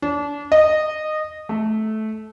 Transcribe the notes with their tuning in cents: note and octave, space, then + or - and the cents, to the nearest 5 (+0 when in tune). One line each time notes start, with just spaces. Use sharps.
D4 -30
D#5 -15
A3 -15